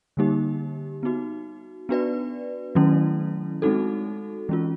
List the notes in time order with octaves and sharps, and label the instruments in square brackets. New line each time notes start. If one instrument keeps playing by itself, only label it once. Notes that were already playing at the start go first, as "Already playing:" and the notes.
[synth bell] D3 G3 A#3 D#4 G4
B3 D#4 F#4
B3 D4 F#4 B4 D5
D#3 F#3 A3 C#4 E4
G#3 C4 D#4 F#4 A4
E3 G#3 C#4 F4